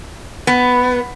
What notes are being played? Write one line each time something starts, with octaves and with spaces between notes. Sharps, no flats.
B3